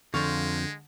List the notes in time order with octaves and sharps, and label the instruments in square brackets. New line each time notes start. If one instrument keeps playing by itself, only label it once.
[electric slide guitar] F2 C5 [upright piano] D3 [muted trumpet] G#3 [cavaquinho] F5 A5 C#6